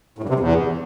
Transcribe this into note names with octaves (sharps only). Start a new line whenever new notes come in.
A2
G2
C3
G2
E2